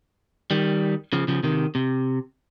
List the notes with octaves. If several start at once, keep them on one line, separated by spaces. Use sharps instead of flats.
D#3 G3
C#3 F3
C#3 F3
C3 D#3
C3